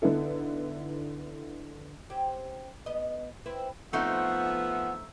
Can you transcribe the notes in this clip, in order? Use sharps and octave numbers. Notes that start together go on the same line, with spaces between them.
D3 B3 D#4 E4 A4
C4 C#4 G4
B3 D#5
C4 E4 B4
F3 A3 B3 C4 D#4 E5 F#5